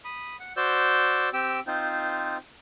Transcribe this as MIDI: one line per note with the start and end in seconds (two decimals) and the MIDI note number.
0.05 0.36 83
0.05 0.36 87
0.40 0.53 78
0.57 1.29 66
0.57 1.29 72
0.57 1.29 74
0.57 1.29 88
0.57 1.29 91
1.33 1.60 60
1.33 1.60 67
1.33 1.60 79
1.33 1.60 88
1.67 2.37 60
1.67 2.37 63
1.67 2.37 65
1.67 2.37 72